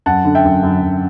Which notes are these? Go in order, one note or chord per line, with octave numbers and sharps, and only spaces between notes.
F#2 F#5 A5
D3
E5 G5
F#2
F#2
F#2